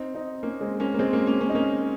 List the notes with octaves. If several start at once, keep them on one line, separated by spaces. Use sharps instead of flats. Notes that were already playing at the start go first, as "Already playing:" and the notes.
Already playing: C4 D#4
C4 D#4
A#3 C#4
G#3 C4
A#3 C#4
A#3
G#3 C4
A#3 C#4
A#3 C#4
A#3 C#4
D#4
A#3 C#4